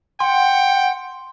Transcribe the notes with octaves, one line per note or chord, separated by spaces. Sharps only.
F#5 G5 C6